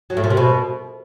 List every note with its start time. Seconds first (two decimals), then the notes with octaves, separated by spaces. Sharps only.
0.10 F#3
0.17 A2
0.24 A#2
0.30 C3
0.37 B2